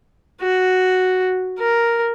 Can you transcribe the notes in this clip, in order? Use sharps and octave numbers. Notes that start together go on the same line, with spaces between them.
F#4
A#4